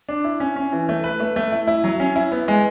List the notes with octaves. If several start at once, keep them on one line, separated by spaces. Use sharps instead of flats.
D4
E4
C#4
C#4
E3
A3
B4
A3
A3
E4
E4
F#3
C#4
E4
B3
G#3